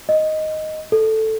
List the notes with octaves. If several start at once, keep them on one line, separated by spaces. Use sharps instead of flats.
D#5
A4